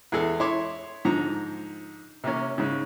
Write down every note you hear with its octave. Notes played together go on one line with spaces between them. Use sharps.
E2 G#3 G#4 A4
E4 C#5 E5 C6 D6
G#2 D3 F3 A#5
C3 A#3 C#4
G#2 C#3